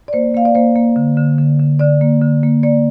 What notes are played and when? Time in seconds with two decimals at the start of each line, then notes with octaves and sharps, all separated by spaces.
0.08 D5
0.13 A#3 C5
0.34 A#3 F5
0.45 D5
0.55 A#3 C5
0.76 A#3
0.96 D3
1.17 D3
1.38 D3
1.60 D3
1.79 D3 D5
2.01 A#3
2.22 D3
2.43 A#3
2.63 A#3 D5